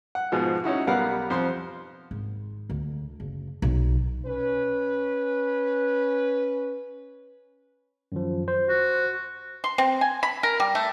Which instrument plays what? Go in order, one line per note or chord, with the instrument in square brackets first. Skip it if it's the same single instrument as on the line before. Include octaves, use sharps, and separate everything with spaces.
[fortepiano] F#5
G#2 B2 F3
C#4 D#4 E4 F#4
B1 G3 B3 A#4 F5 F#5
F2 C5 C6
[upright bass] G#1
D2
F#1
B1
[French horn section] C#4 B4
[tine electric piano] F#2 D#3 F3
C5
[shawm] F#4
[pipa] C6
C4
G#5
B5
A#4
G3
A3